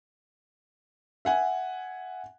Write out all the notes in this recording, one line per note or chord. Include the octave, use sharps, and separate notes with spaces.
E5 F#5 G#5